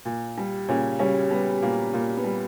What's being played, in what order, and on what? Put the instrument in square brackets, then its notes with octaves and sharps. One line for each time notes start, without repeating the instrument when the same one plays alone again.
[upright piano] A#2
G3
A#2 C#3 C#4
C#3 G3 C#4
G3 B3
A#2 A#3
A#2 A#3
B3
G3